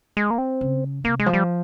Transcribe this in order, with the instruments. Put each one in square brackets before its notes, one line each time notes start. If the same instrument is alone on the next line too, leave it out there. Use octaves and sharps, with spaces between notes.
[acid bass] G#3
A#3
C4
[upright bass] C#3
[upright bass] C3 [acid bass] A#3
[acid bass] G#3
[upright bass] F3
[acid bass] G3